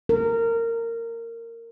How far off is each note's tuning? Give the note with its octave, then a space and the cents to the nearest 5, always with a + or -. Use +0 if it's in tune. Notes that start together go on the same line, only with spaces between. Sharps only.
A#4 -20